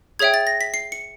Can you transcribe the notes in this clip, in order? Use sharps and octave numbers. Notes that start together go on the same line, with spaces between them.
G#4 C#5 E5 G5 G#6
A6
A#6
B6
C7
C#7